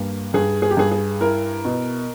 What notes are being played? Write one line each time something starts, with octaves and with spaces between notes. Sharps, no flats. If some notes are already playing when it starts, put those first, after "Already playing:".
Already playing: G2 A#3
G2 G#4
G#4
G4
G2 G#4
G#4
E4 A#4
B2